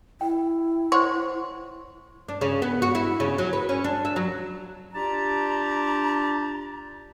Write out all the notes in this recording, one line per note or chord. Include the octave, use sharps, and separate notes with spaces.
E4 G5
C5 C#5 F#5 C6
D4
C#3
B3
F#4
E4
C#3
F#3
B4
C#4
D4
E5
F#3
D4 F4 G4 A5 A#5